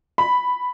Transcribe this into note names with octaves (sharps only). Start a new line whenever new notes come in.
B5